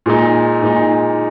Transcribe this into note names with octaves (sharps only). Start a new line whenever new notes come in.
A#2 G#3 D#4
A#2 G#3 D#4